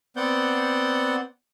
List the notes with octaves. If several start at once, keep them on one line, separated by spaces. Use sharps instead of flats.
B3 C4 D5 F#5 G6